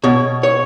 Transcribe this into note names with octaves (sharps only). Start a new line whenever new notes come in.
B2 C#5
C#5